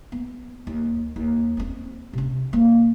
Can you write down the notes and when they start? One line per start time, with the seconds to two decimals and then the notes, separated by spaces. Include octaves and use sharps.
0.12 B3
0.67 D#2
1.16 D#2
1.57 C4 C#4
2.13 C3 C#4
2.53 A#3 C4